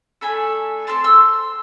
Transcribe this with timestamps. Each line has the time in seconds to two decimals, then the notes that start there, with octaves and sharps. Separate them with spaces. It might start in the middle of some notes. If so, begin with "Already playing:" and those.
0.21 A3 D4 A4 G#5 B5
0.87 C4 E4 A4 A5 C6
1.04 C6 E6